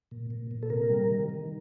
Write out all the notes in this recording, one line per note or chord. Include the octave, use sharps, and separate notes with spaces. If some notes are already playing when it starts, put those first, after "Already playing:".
A#2
A#2
A#2
A4
C3 A#4
G3
D#3
D#3